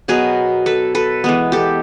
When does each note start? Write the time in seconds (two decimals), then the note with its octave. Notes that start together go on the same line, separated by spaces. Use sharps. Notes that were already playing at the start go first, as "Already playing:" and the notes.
0.08 B2 F#3 B3 G#4 A#4
0.66 A4 B4
0.95 A4 B4
1.24 E3 G#3 B3
1.52 G4 A4